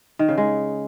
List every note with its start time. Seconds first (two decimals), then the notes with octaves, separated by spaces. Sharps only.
0.19 D#3
0.28 C#3
0.38 G#3